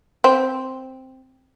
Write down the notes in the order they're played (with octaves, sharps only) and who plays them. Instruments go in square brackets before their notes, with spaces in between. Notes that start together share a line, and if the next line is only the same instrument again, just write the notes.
[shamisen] C4